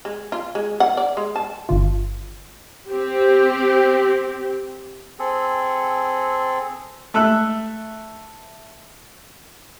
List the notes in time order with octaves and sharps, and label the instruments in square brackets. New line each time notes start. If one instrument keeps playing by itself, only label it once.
[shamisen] G#3
F4
G#3
F#5
D5
G#3
A5
[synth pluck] G1 F4
[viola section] C4 G4
[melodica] C4 G#4 A4
[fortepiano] A3 E5 E6 F#6